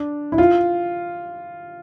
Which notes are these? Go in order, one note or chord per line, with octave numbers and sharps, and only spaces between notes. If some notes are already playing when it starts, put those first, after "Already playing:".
Already playing: D4
E4
F4